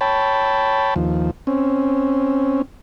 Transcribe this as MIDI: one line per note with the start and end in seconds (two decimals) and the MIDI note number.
0.01 0.94 73
0.01 0.94 79
0.01 0.94 81
0.01 0.94 83
0.96 1.31 39
0.96 1.31 53
1.47 2.62 60
1.47 2.62 61